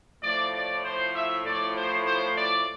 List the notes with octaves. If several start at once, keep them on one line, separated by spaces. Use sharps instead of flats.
A2 F3 D5
D5
C5
E5
A2 F3 D5
C5
C5
D5